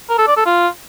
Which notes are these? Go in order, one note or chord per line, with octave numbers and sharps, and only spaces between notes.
A#4
A4
D5
A4
F4